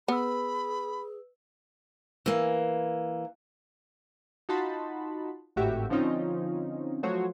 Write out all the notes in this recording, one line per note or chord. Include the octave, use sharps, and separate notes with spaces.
B3 G#4 B4 B5 E6
E3 A#3
D#4 F4 F#4 A5 B5 C6
G#1 A2 F#4 G4 E5
D3 F3 C4 C#4 D#4 F4
F3 F#3 A3 F#4 C5 C#5